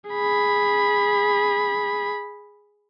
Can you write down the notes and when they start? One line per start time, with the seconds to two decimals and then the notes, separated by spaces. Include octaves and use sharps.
0.11 G#4 B5